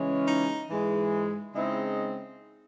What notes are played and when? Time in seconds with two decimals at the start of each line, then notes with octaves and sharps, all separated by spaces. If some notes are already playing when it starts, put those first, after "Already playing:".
Already playing: C#3 E3 G#3 C#4
0.25 D#4
0.68 G#2 E3 G#3
1.55 C#3 G#3 C4 D#4 E4